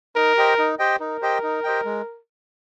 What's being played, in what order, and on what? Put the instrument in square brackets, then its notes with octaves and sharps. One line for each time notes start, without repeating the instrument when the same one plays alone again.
[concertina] D#4 [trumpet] A#4
[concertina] G4 C5 D#5 G5
D#4
G4 C5 D#5 G5
[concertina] D#4 [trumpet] A#4
[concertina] G4 C5 D#5 G5
D#4
G4 C5 D#5 G5
G#3